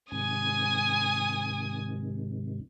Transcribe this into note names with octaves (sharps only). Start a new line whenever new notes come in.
G#2 C3 D#3 G#5 D#6